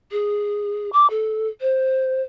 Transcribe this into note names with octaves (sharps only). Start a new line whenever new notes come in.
G#4
D6
A4
C5